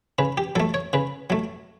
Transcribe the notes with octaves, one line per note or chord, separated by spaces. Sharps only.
C#3 B4
G4
F#3 A3 A4
C#5
C#3 B4
F#3 A3